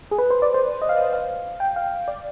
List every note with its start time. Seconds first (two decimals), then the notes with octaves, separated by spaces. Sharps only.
0.11 G#4
0.18 B4
0.31 C5
0.42 D5
0.54 C5
0.82 D#5
0.89 F5
1.13 F5
1.60 G5
1.76 F5
2.08 D5